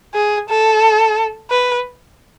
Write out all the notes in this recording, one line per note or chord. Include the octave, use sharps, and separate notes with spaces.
G#4
A4
B4